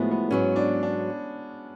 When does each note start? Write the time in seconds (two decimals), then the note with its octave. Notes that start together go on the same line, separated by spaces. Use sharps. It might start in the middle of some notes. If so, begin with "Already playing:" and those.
Already playing: A2 F3 F#3 G#3 A3 B3
0.11 B3
0.31 G#2 F#3 B3 C#4
0.56 D4
0.83 D4